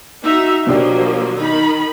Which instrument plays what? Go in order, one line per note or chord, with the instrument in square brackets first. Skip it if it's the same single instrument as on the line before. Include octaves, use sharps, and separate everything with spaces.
[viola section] D#4 F#4 E5
[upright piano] B2 D4 G4 [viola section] F3 F#3 A#3
[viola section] D#3 D#4 B5